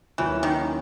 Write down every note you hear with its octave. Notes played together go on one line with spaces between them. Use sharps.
D#2 C#3 E3 F#3 C#4 E4
D#3